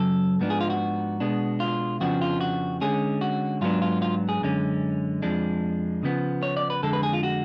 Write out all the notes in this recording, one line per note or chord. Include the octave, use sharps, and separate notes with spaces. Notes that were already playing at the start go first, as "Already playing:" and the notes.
Already playing: F#2 C#3 F#3 A4
G#2 F3 B3 D4
G#4
F4
F#4
B2 G#3 B3 D4
F4
F2 C#3 F3 B3 D4 F#4
F4
F#4
D3 G#3 C#4 G#4
F#4
G#2 F#3 B3 D4 F4
F4
F4
G#4
F#2 D3 G#3 C#4
F2 F3 G#3 D4
C#3 F3 B3
C#5
D5
B4
F2 D3 G#3 A4
B4
G#4
F4
F#4